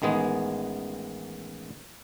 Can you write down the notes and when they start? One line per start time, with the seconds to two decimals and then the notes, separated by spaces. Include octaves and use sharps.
0.02 A1 D#3 G#3 B3 G#4